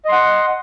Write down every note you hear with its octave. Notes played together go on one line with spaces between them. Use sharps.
D#5 F#5 C6